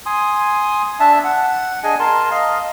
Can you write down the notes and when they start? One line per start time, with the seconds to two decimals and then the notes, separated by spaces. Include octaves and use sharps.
0.06 G#5 C6 D#6
1.00 D4 E5 A5
1.24 F#5
1.84 D4 G#4 D#5 G#5
2.00 A#4 A5 C6
2.31 D#5 F5